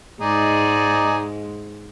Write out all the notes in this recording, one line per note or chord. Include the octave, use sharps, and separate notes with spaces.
G#2 G#3 D#4 G#4 D5